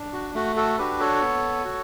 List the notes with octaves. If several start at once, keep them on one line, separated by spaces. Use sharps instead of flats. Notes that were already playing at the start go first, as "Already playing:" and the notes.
Already playing: D4
F#4
A3 F#4
F#4 A4
D4 F#4 G4 B4
A4 C#5
B3
F#4